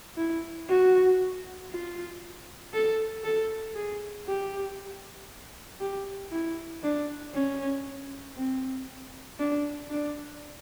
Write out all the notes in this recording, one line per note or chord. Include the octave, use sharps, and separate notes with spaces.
E4
F#4
F4
A4
A4
G#4
G4
G4
E4
D4
C#4
C4
D4
D4